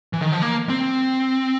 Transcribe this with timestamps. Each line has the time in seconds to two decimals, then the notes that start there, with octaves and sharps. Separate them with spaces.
0.13 E3
0.22 D#3
0.32 F3
0.42 A#3
0.69 C4